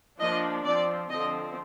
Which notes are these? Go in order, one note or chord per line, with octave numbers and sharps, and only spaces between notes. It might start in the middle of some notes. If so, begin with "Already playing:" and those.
F3 A#3 D4 D#5
F3 C4 D5
D3 F3 C4 D#5